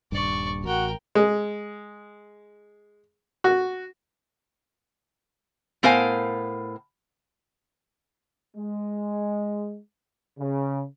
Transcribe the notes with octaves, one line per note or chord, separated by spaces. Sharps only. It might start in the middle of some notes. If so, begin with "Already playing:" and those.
D#1 G2 D5 C#6
A1 F#4 A#4 G5
G#3
F#4
A2 B3 A#4 C5 F5 G#5
G#3
C#3